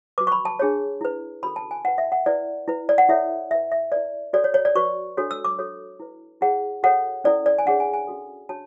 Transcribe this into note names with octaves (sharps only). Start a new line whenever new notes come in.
F#4 B4 D6
C#6
B5
A5
D4 G#4 C#5
E4 B4
C#4 F#4 A4 B5
A5
G#5
E4 B4 F#5
E5
F#5
E4 B4 D5
E4 B4
D5
F#5
E4 A4 C#5 E5
E4 B4 E5
E5
E4 B4 D5
F#4 A4 C#5 D5
C#5
C#5
D5
F#4 B4 C#6
D4 F#4 A4 C#5
E6
D6
F#4 A4 C#5
E4 B4
E4 G#4 C#5 F#5
F#4 A4 C#5 F#5
C#4 E4 A4 D5
D5
G#5
D4 G#4 C#5 F#5
G#5
G#5
C#4 F#4 A4
D4 F#4 C#5 A5